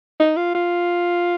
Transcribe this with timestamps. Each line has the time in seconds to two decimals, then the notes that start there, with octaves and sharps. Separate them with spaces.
0.19 D#4
0.36 F4
0.55 F4